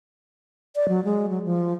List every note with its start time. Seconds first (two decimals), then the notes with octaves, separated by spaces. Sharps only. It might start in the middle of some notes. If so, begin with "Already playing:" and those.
0.75 D5
0.89 F#3
1.05 G#3
1.30 F#3
1.44 F3